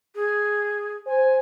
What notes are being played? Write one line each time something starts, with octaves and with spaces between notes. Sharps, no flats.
G#4
C5 G#5